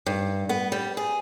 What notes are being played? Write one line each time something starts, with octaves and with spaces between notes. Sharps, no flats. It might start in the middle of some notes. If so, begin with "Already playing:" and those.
G2
B3
G3
G#4